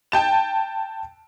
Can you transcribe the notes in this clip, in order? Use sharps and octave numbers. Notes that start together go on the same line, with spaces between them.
G5 A5 E7